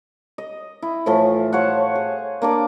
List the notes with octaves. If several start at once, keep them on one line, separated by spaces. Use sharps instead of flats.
D#5
E4
A2 E3 F3 A3
C5 C#5 F5 F#5
G#4
A#3 D4 D6